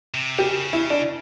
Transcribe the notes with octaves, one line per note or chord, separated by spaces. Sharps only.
C3
C#3 G4
E4
D4